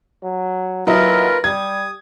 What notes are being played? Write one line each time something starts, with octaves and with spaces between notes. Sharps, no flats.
F#3
D#2 F#3 E4 F4 A#4 B4 D#5
G3 D#6 G#6